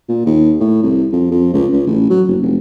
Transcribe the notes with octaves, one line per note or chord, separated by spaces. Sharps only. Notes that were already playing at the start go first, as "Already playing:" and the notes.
A#2
D#2
A2
C2
F2
F2
C#2
C#2
A1
F#3
F#1
F1